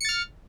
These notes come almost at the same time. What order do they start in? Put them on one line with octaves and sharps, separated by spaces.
C#7 A6 F6